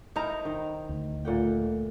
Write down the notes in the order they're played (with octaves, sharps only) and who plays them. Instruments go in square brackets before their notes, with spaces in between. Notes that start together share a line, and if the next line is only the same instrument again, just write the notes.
[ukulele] D#4 C5 A#5 [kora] E4 A#4
[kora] D#3
[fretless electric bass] D2
[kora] A#2 F#5 G5 [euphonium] A3